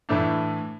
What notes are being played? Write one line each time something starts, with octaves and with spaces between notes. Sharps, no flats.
A2 E3 A3 D4